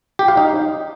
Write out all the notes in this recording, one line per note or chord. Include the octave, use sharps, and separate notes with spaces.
G4
F5
D#4